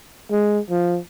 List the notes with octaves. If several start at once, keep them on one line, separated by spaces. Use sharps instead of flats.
G#3
F3